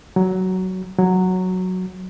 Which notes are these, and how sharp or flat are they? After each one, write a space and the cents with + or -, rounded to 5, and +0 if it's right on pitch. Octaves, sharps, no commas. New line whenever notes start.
F#3 +10
F#3 -5